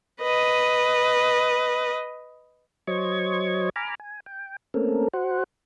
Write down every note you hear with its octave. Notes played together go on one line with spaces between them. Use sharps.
B4 D#5
F#3 C5 C#5 D#5 C#6 G#6
G#5 A#5 B5 D6 F6
G#5
G5
A3 A#3 C4 C#4 A4 A#4
F#4 C5 F#5